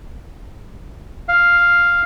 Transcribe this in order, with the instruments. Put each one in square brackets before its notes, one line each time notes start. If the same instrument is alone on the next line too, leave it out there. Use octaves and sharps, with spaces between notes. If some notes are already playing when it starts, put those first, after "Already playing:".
[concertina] F5